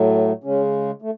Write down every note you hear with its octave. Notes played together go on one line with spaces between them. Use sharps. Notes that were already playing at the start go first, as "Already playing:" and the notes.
Already playing: A2 F#3 A3
C#3 G#3 C#4
A3